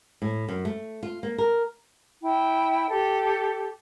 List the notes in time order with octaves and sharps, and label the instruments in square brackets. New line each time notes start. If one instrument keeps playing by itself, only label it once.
[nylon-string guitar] A2
F#2
A3
F4
A#3
A#4
[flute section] E4 G5
G4 A4